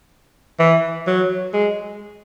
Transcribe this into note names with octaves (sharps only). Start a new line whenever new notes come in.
E3
F#3
G#3